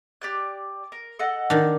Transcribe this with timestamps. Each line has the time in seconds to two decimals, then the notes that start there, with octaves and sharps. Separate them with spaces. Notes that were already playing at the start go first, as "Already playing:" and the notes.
0.21 G4 D5 F#6
0.92 A#4
1.19 A4 D#5 F#5
1.50 D#3 D4